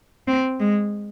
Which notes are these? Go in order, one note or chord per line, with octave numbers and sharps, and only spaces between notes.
C4
G#3